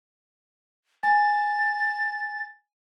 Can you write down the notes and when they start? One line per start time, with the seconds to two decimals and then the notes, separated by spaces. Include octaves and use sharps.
1.03 G#5 A6